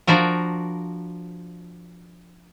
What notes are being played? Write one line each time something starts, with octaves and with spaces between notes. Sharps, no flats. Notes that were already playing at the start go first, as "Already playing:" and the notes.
F3 D4 F#4 A#4